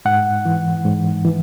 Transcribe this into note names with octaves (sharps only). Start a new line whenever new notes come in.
G#2 F#5
E3
G#2
E3